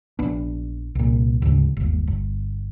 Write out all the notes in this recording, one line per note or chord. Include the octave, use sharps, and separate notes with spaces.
A#1 B3 D4
C2 A#2
D2 G#2 C#3
G1 D#2
G1